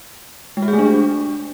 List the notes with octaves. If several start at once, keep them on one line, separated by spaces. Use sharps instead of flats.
G#3
F#4
G#4
A3
D4